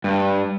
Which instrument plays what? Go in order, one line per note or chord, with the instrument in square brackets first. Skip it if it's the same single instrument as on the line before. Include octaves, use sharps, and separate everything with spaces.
[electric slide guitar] G2